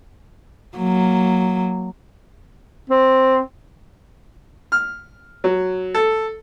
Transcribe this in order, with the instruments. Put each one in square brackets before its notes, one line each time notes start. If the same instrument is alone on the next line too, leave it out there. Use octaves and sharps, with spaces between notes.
[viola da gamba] F#3 A#3
[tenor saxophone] C4
[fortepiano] F6
F#3
A4